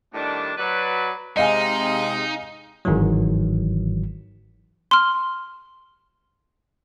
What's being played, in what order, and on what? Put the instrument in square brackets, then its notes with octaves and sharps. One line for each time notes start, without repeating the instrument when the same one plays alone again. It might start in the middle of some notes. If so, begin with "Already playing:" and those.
[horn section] A2 D#3 G3 D4
F#3 B4 D5
[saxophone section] C3 G#3 [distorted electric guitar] D#4 [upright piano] D#5 F5 G#5
[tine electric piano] G1 G#2 D#3 E3 F#3
[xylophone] C6 F6